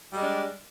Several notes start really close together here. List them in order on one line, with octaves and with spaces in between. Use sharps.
G3 G#3 D4